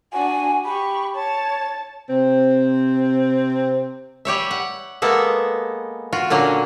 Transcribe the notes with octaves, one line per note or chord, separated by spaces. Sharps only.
D4 F#4 G#5
G4 B5 C#6
C#5 A5
C3 C4
G3 G4 C#5 E5
F#5
G#3 A#3 B3 A4 E5
F4 F#4
A#2 D3 F#3 A#3 C#4